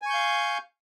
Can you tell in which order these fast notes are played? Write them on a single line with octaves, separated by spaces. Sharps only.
G#5 C#6 G6 F5